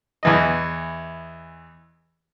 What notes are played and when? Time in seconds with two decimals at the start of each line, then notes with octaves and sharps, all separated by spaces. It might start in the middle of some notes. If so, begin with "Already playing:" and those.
0.23 E2 E3 D#5